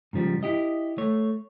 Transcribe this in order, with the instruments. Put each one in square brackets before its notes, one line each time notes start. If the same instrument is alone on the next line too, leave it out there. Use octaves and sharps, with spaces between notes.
[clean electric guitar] G#2 C#3 F3 G3
E4 G4 D#5
A3 C#5